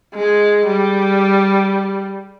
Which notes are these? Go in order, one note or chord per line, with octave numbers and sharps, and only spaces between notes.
G#3
G3